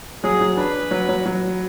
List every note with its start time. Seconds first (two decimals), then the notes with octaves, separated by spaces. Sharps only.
0.24 F#3 G#4
0.41 F#3
0.57 D4 B4
0.91 F#3
1.09 F#3
1.26 F#3